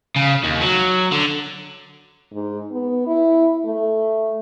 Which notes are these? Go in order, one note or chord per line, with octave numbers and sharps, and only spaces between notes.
C#3
D#2
F#3
D3
G#2
B3
E4
A3